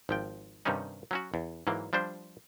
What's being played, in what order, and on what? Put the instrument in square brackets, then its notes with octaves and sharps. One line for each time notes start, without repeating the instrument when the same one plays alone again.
[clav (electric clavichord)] G#1 F3 G5
G2 C3 D#3 G3 C#4 D#4
F#3 C#4 F#4
E2
G#2 E3 F#3 A#3
F3 G3 D4 C5